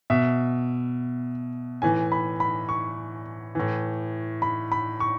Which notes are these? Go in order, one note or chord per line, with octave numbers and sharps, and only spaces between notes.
B2 E5
A2 E3 G#5
B5
B5
C#6
A2 E3
B5
B5
C#6